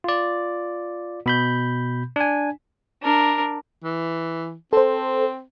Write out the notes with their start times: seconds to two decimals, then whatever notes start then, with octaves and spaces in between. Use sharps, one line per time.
0.04 F4 D5
1.26 B2 B5 G6
2.16 D4 G#5
3.02 D4 A#4
3.84 E3
4.73 C4 A4 C5